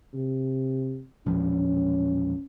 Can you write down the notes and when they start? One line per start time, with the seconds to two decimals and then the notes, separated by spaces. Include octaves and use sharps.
0.14 C3
1.26 E1 A#1 F3 C#4